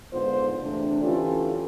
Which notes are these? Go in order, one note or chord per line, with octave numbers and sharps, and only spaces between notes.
G#2 D3 B3 F4 C5
E2 C3 A3 D4
D3 E3 C#4 F4 G4 A4